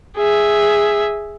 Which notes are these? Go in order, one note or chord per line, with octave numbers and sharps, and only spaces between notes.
G#4 E5